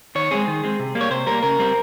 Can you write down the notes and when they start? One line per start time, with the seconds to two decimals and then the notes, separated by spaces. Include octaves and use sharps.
0.15 D#3 C#5
0.31 G#3 C4 G#4
0.48 D#3
0.63 G#3 C4
0.79 C3
0.95 G3 A#3
1.01 C#5
1.11 C3 C5
1.27 G3 A#3 A#4
1.43 C#3 A#4
1.59 G3 C4